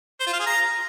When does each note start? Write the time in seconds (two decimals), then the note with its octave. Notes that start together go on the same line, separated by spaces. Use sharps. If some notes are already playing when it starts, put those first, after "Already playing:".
0.20 C5
0.27 F4
0.33 F5
0.40 G#4
0.46 A#5